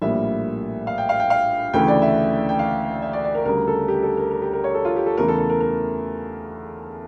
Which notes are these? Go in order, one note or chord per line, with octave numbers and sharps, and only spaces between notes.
A#1 A2 G3 A#3 E5
F5
G5
F5
G5
F5
D2 C#3 E3 A3 G5
D5
E5
G5
F5
E5
D5
D5
A#4
D2 C#3 G3 A#4
A4
G4
A4
A#4
A#4
G4
A#4
C#5
A4
F4
G4
A4
E2 C#3 E3 A3 A#4
A4
A4
A#4
A#4